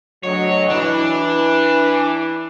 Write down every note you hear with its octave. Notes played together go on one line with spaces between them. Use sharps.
D2 F#3 C#5 D#5
E3 D4